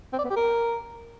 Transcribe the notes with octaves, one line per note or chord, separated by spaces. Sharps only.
C4
D5
B3
G4
A#4